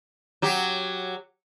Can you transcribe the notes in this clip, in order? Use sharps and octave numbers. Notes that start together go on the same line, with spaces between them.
F#3 G4